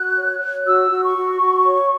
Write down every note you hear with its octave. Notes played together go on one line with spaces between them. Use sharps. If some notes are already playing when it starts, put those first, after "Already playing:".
Already playing: F#4 F#6
C#5
C#5
F#4 E6
F#4
C#6
F#4
F#4
C#5